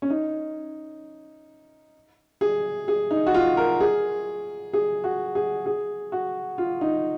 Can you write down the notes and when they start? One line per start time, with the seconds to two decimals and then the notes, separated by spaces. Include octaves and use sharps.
0.02 C#4
0.10 D#4
2.41 G#4
2.88 G#4
3.11 D#4
3.26 F#4
3.34 F4
3.57 A#4
3.81 G#4
4.73 G#4
5.04 F#4
5.35 G#4
5.66 G#4
6.12 F#4
6.58 F4
6.81 D#4